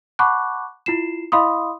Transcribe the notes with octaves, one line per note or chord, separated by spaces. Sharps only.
F#5 A5 B5 C#6 D6 F#6
E4 F4 C7 E7
E4 D#5 F5 B5 C6 D#6